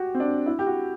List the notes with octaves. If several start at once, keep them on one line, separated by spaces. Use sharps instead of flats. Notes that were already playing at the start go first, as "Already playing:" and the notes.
Already playing: F#4 G4
C4
D4
E4
G4
F#4